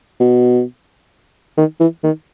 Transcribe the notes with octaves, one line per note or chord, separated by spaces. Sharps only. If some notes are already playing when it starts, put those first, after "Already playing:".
B2
D#3
E3
D#3